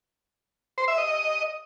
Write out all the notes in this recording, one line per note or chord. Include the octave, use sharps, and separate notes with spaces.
C5
E5
D#5